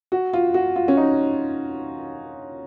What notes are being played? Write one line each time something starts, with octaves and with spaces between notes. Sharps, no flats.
F#4
F4
F#4
F4
C#4
D#4